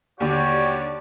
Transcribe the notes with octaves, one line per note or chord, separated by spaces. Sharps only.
D#2 D3 G3 D4 F#4 G4 C#5